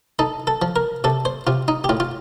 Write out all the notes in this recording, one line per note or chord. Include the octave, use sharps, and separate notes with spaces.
D#4 A4
A4
F3
A#4
C3 A4
C5
C3 F4
D#4
G4
A2 F4
F4